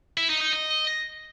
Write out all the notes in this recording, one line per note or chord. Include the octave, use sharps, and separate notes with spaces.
E4
D#4
D#4
D#5